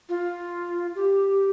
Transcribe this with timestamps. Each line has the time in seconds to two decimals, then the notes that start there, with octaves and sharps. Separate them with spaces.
0.09 F4
0.95 G4